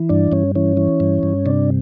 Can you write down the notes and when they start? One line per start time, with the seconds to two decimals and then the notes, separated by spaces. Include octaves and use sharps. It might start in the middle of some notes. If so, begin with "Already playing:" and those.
Already playing: E3
0.09 G2 D4
0.32 G2 C#4
0.55 E3 C#4
0.77 E3
1.00 G2
1.23 G2
1.46 C3 D4